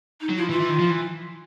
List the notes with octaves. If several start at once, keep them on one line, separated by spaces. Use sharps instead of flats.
D#4
F#3
F3 E4
E3 F4
E3
D#3
F3
E3